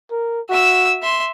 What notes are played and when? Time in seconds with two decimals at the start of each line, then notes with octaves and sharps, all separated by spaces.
0.11 A#4
0.49 F#4 E5 E6
1.02 E5 C6